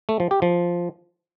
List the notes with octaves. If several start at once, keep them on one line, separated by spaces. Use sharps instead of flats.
A3
F3
G4
F3